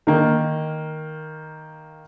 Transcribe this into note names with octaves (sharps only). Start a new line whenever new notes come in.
D#3 A#3